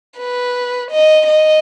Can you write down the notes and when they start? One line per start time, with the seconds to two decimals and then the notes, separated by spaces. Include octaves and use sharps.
0.18 B4
0.91 D#5
1.27 D#5